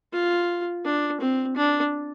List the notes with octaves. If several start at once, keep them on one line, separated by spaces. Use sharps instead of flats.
F4
D4
C4
D4